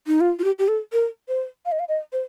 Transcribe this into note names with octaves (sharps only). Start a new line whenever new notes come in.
D#4
F4
F4
G4
G4
A4
A#4
C5
F5
D#5
F5
D#5
C5